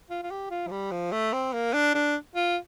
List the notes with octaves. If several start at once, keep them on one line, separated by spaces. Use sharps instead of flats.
F4
F4
G4
F4
F3
G3
F3
A3
C4
A#3
D4
D4
F4